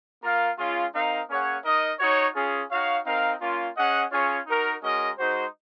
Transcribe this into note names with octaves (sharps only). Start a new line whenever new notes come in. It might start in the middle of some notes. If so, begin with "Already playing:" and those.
A#3 F4 A#4 F5
G#3 C#4 F4
C4 D#4 A#4 F5
A#3 C#4 G#4 C#5 F#5
D#4 A#4 D#5
D#4 F#4 C#5
C#4 F4 G#4
D#4 F#4 C#5 F5
C4 D#4 A#4 F5
A#3 C#4 F4
C#4 G#4 D#5 F#5
C#4 F4 G#4 C#5
D#4 F#4 A#4
G#3 C#4 F#4 A#4 D#5
G#3 D#4 F#4 C5